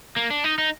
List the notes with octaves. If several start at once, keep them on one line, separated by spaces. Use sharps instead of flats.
A#3
D4
D#4
D#4